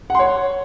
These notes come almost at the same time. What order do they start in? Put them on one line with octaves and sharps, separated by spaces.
F#5 C6 C#5